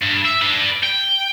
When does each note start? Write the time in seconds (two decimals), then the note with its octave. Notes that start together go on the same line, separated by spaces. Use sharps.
0.02 G2
0.25 E5
0.42 D4 B4
0.83 G5